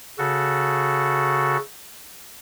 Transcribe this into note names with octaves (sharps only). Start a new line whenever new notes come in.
C#3 F#4 A4